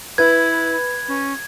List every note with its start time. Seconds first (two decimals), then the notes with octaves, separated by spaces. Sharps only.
0.18 E4 B4 G#6
1.08 C#4